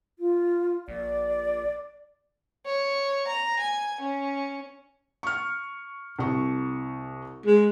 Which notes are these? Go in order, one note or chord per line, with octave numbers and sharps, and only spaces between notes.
F4
A#1 D5
C#5
A#5
G#5
C#4
C#6 F6
C2 C#6
G#3